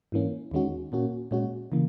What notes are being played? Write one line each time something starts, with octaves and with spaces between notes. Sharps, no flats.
G#2 E3 A#3 C#4
D#2 D#3 G#3 C#4 F#4
A#2 A#3 C#4 F#4
A#2 G#3 C#4 F#4
C#3 E3 A#3